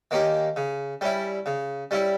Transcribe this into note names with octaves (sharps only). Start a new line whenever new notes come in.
D#3 A#3 C#4 G4
C#3
G3 C#4 E4
C#3
G3 C#4 E4